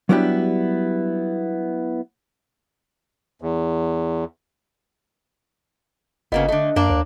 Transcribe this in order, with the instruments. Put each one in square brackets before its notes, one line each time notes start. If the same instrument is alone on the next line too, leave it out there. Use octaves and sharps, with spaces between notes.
[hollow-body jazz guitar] F#3 G3 B3 D4 E4 G4
[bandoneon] E2
[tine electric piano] G1 D#5 [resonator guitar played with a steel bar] C#3 A#3 B3
[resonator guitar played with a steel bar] D3 A3 [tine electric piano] D#5
[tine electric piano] F#2 [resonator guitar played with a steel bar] A#3 D4
[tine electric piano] D#2